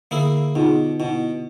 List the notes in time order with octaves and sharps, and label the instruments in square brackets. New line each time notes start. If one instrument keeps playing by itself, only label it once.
[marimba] D3 E6 [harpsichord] A#3 E4 G#4
[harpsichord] B2 [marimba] D#4 F4 G#4
[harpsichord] B2 [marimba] E4